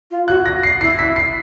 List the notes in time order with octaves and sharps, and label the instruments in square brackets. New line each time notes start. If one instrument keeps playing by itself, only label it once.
[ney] F4
[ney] F#4 [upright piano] F#6
[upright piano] A#6
C7
[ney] E4 [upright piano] C7
[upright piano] B6
C7